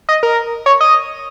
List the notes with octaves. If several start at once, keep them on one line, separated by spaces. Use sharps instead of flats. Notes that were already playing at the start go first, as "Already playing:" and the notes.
D#5
A#4
C#5
D#5